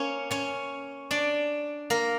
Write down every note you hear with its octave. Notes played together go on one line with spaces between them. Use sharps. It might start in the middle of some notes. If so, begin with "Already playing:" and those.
Already playing: A#3 C#4 C#5
C#4 C#5
D4 D5
A#3 A#4